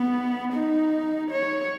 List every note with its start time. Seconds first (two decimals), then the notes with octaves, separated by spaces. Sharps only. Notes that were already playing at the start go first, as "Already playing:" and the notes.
Already playing: B3
0.53 D#4
1.31 C#5